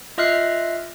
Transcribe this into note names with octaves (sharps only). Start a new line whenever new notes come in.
F4 D#5 E5 F6 F#6 C7